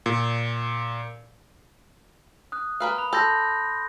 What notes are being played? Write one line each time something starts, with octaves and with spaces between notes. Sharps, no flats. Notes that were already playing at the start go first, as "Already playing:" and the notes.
A#2
D#6 F#6
A#3 B4 F5
B5
A4 C6 G6 A#6